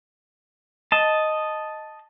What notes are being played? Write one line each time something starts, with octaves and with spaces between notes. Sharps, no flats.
D#5 A5